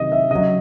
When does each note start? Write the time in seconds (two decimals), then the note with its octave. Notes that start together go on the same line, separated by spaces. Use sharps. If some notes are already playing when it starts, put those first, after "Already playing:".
Already playing: C3 D#3 F#3 D#5
0.12 E5
0.31 C#3 F#3 D#5